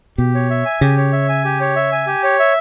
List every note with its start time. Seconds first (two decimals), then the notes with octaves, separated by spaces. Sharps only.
0.18 B2 G4
0.35 C#5
0.50 E5
0.65 G#5
0.81 C#3 G4
0.97 C#5
1.12 E5
1.29 G#5
1.45 G4
1.60 C#5
1.76 E5
1.92 G#5
2.07 G4
2.23 C#5
2.39 E5